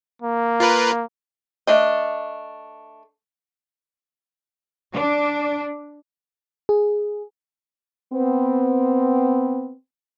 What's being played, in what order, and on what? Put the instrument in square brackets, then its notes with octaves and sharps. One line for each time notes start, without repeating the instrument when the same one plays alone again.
[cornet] A#3
[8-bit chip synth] F4 A#4 B4
[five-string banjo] A3 D4 D#5
[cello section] D4
[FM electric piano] G#4
[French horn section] B3 C4